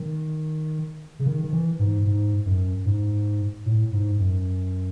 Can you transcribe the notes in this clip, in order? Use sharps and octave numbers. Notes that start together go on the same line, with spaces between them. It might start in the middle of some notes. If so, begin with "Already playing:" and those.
Already playing: D#3
C#3
D#3
D#3
E3
G#2
G#2
F#2
G#2
A2
G#2
F#2